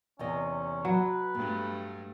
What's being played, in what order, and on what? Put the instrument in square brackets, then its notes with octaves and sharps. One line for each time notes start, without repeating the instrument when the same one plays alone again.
[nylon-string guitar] E2 C3 D#5 [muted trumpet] C#4
[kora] F#3 [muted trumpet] B4
[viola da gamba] G2 A3 [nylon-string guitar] B3